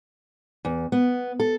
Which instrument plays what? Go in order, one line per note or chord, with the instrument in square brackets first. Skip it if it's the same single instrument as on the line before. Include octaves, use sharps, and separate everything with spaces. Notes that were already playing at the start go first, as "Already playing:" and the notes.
[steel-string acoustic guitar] E2
B3
A4